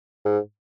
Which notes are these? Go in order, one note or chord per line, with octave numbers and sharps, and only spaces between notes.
G#2